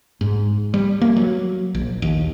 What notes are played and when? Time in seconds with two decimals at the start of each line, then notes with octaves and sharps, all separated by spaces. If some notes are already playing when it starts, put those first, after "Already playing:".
0.21 G#2
0.74 G3
1.01 A#3
1.17 F#3
1.75 A#1
2.02 D#2